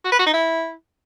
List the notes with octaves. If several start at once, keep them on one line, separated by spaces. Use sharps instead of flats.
F#4
B4
F#4
D#4
E4